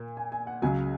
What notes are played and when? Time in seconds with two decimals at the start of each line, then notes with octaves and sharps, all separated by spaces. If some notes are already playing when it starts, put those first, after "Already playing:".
Already playing: A#2 A#3
0.17 G#5
0.32 G#5
0.47 F#5
0.62 C#2 C#3 F#3 G#5